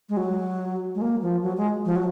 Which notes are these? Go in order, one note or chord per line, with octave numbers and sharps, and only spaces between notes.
G#3
F#3
G#3
A#3
F3
F#3
G#3
F3
F#3